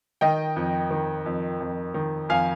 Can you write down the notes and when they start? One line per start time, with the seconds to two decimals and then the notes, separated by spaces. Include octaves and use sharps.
0.21 D#3 D#5 G5
0.56 F2
0.91 D#3
1.26 F2
1.61 F2
1.94 D#3
2.29 F2 F5 G#5